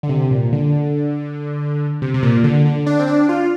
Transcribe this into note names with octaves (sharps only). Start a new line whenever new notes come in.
D3
C3
A#2
D3
C3
C3
A#2
D3
D3
D4
C4
D4
F4